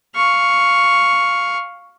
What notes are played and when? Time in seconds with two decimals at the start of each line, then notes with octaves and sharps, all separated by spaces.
0.15 F5 C#6